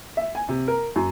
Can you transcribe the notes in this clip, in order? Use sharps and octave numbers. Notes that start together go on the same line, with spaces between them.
E5
G#5
C3
A#4
F#2